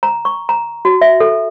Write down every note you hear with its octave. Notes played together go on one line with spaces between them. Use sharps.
A#5
C#6
A#5
F#4
E5
A4